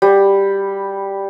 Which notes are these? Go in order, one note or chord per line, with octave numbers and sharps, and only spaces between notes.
G3